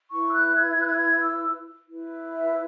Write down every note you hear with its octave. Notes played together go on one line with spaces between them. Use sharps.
E4 B4 C#6
E6
F#6
G#6
G#6
F#6
G#6
G#6
E6
E4 B4
E5